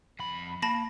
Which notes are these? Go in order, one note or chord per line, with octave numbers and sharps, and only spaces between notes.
F2 B5
A#3 A5 B5 A#6